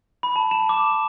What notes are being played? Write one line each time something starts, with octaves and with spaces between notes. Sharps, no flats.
B5
A5
E7
D6